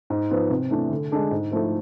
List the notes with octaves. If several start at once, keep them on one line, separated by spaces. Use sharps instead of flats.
G#2
F3 B3
C3
E3 A3 D4
D3
G#3 D4 A4
G#2
F3 A3 E4 A4